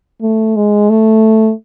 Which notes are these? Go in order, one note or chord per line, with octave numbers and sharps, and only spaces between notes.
A3
G#3
A3